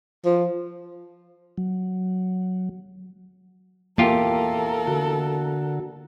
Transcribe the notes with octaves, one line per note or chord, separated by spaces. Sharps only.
F3
F#3
E2 A#3 F4 G4 A4 A#4
D3 F#4